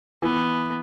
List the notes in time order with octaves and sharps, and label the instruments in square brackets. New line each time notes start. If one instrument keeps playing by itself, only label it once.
[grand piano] E3 [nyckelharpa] B3